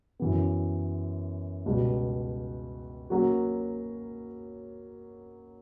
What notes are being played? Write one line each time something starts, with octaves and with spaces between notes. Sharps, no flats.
F#2 E3 B3
C#2 B2 G3
F#3 A#3 C#4 F#4